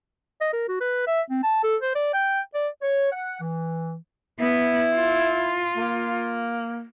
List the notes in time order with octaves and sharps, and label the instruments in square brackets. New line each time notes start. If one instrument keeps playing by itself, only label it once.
[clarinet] D#5
A#4
F#4
B4
E5
C4
A5
A4
C5
D5
G5
D5
[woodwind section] C#5
F#5
E3
[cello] B3 [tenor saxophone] E4
[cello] F4
[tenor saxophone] A#3